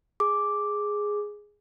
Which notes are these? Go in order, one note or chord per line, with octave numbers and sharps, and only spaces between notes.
G#4 D6